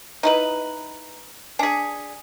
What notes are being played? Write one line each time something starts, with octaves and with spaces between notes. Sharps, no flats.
D#4 E4 B4 A#5
D4 G#4 G#5 B6